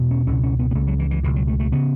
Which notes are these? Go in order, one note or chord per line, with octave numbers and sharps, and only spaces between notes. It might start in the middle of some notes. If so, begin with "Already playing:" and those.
Already playing: E2 B2
C#4
C#2 B2 C#4
C#4
B3
B3
C#2 C#3 A3
F#3
E3
E3
C#2 B2 E3
F#3
A3
A3
C#3 B3